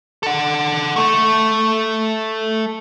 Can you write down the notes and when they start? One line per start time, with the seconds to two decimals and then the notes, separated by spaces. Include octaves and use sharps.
0.23 A4 F#5
0.96 A3 A4